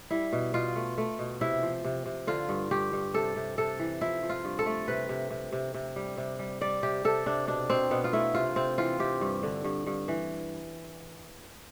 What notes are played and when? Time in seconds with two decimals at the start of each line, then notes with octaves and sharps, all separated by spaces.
0.11 G3 E4
0.32 B2
0.54 B2 F4
0.76 A3
0.98 A3
1.19 B2
1.41 C3 E4
1.63 F3
1.85 C3
2.06 C3
2.27 D3 F4
2.49 G2
2.71 G2 G4
2.93 G2
3.14 C3 A4
3.36 C3
3.58 C3 A4
3.79 E3
4.01 F3 E4
4.23 F3
4.29 F4
4.45 G2
4.59 A4
4.66 A3
4.88 C3 B4
5.09 C3
5.30 C3
5.52 C3
5.74 C3
5.96 G3
6.17 C3
6.39 G3
6.61 G3 D5
6.83 C3 G4
7.05 C3 A4
7.26 C3 D4
7.47 B2 D4
7.70 B2 C4
7.91 B2 B3
8.04 F4
8.13 A3 E4
8.34 C3 F4
8.56 C3 C4
8.78 E3 F4
8.99 C3 G4
9.21 G2
9.43 D3
9.64 G2
9.86 G2
10.08 E3